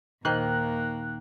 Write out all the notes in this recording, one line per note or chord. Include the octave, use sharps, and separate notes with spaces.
D#2 A#2 D#3 A#3 C5 G5 F#6